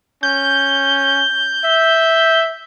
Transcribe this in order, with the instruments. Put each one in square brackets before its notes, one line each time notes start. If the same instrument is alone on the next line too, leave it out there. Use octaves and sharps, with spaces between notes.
[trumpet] C#4 [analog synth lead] G6
[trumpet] E5